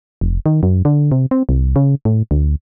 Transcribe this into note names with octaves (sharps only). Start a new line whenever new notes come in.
F1
D#3
F#2
D3
C3
C4
C2
C#3
A2
D2